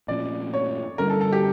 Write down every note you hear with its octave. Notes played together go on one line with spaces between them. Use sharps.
A#2 F3 C#4 D5
C#5
D3 G3 C#4 A#4
A4
A4
G4